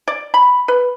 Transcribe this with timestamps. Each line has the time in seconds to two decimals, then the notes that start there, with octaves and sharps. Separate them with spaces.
0.08 D5
0.34 B5
0.68 B4